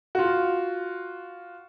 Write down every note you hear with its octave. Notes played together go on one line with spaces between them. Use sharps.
F4 F#4